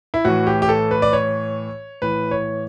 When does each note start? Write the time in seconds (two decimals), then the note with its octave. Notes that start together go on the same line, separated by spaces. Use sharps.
0.14 E4
0.25 A2 E3 F#4
0.47 G4
0.62 G4
0.69 A4
0.91 B4
1.02 D5
1.13 C#5
2.02 A2 E3 B4
2.31 C#5